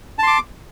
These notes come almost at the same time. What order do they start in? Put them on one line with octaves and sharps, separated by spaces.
A5 C6 D6